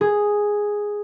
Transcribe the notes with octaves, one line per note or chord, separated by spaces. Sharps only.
G#4